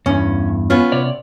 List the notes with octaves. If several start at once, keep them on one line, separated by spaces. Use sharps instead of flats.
E2 G2 C#4
B3 C#4 F4
C3 C#5 D5